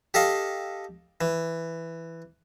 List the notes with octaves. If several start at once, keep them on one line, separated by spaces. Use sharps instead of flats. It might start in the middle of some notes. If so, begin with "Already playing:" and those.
G4 A4 D#5 F5
E3